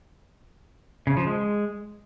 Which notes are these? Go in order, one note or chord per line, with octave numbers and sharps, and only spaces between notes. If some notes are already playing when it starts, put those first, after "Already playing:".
C#3
F3
G#3